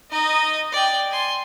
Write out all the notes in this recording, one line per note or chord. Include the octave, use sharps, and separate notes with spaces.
D#4 D#5
D5 G5
G#5 C6